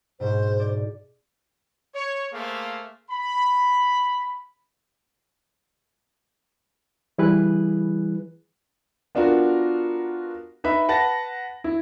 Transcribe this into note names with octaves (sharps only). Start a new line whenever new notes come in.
G#2 B2 C5
D5
C#5
A3 A#3 G#4 C5 F5
B5
E3 G3 E4 G#4 B4 F#6
B3 D4 F4 F#4 A#4
D#4 B4 D#5 E5 B5
B4 F#5 A5 A6 A#6
E4